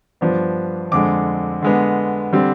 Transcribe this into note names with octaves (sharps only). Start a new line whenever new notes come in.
G2 F3 B3 D4
F2 D3 G#3 D6
D3 G#3 B3
D3 G3 C4